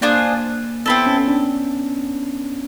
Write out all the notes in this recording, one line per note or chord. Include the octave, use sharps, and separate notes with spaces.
A#3 D4 F4 G#4 C5
B3 C4 E4 A4
C#4
D4